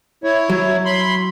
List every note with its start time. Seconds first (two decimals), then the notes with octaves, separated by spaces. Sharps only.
0.24 E4 C#5
0.50 F#3
0.85 B5 C6